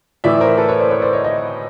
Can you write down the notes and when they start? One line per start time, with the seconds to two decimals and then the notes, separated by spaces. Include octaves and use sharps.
0.24 A2 E3 D5 E5
0.41 A#4 C5
0.57 A4 B4
0.69 B4 C#5
0.79 C5 D5
0.90 B4 C#5
1.02 C5 D5
1.13 C#5 D#5
1.24 C#5 D#5